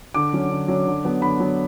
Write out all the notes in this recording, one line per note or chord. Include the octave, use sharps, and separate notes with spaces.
D3 D6
F#3 C#4
D3
F#3 C#4
D3
F#3 B3
D3 B5
F#3 B3